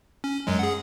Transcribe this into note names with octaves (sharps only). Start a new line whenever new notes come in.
C#4
F#2 F#3 G#3
G#4 F#5